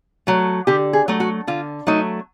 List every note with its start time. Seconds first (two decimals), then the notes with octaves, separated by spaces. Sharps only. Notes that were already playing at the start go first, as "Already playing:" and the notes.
0.27 F#3 A3
0.67 D3 G4
0.93 G#4
1.08 F#3 A3
1.20 F#4
1.47 D3 F4
1.87 F#3 A3 D#4